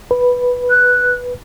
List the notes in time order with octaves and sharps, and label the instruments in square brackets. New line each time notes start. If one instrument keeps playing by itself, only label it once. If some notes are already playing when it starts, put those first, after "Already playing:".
[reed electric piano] B4
[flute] F#6